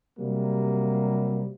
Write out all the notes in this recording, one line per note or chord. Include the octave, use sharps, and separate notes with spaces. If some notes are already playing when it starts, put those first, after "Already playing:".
C3 F#3 G3 A#3